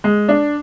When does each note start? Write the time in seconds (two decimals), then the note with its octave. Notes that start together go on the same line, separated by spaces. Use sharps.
0.04 G#3
0.29 D4